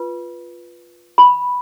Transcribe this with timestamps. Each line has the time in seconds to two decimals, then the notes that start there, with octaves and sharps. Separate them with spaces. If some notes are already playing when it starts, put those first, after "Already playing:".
Already playing: F4 B4
1.18 B5